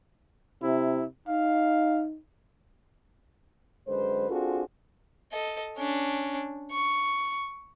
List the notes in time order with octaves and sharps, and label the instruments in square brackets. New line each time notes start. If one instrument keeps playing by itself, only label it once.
[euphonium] C3 [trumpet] E4
[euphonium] D#4 [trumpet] F5
[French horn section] F#2 D3 G#3 B4 C5
C4 D4 F4 F#4 G#4 A4
[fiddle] A4 D#5
C#4 D4
C#6